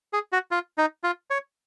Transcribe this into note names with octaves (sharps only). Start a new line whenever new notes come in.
G#4
F#4
F4
D#4
F4
C#5